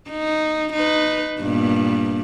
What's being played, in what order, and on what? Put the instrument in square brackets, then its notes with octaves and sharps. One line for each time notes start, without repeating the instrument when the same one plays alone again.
[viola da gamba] D#4
D#4 B4
G2 A#2 B3